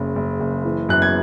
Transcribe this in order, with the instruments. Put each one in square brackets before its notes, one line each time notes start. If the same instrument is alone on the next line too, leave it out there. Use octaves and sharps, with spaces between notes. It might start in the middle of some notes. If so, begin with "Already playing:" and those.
Already playing: [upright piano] F#1 C#3
F#1
F#1
E3
F#2 F#6
G#6